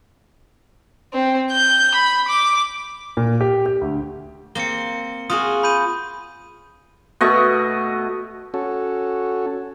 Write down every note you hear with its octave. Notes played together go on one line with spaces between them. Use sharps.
C4
G6
B5
D6
A#2
G4
G4
D2
A#3 C4 C#7 G7
F4 F#4 G#4 D#6
B5 G6 D#7
B2 A3 D#5 C#6
C#4 F#4 A4